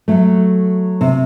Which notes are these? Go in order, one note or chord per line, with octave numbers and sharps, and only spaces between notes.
F#3 A3
C3